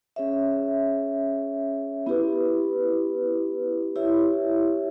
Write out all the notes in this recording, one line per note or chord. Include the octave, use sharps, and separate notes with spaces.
C#4 G#4 C#5 E5
B3 E4 G4 B4
E4 G4 C#5 E5